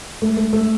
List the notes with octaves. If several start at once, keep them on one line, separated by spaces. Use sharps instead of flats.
A3
A3
A3